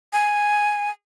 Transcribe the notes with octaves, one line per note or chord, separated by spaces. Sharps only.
G#5